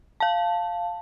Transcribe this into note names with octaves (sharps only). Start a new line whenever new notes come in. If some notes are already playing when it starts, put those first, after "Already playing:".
F5 A5